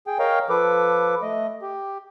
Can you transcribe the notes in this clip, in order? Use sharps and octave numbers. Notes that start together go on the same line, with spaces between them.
G#4 G5
A#4 C#5 D#5 F5 G5 A#5
F3 A4 B4 D6
A3 D#5
G4